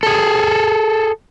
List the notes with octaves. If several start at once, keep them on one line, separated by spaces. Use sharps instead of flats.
G#4 A4